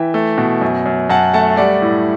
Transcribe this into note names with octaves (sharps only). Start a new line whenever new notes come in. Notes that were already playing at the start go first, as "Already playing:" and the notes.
Already playing: E3 E5 G5
A3
B2
F#2
F#2
F#2 F#5 A5
A3 F#5 A5
G3 D5 F#5
A2